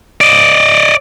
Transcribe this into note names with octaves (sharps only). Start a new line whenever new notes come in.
D5 D#5